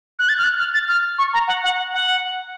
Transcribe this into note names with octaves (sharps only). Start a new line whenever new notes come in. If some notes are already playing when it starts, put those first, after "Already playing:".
F#6
A6
F6
F#6
F6
A6
F6
C#6
A#5
F#5
F#5
F#5